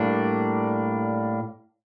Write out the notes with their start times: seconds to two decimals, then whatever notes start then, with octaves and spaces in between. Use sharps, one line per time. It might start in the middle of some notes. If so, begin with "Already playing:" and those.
Already playing: A2 G3 A#3 D4